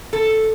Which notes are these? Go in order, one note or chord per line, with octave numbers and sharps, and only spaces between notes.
A4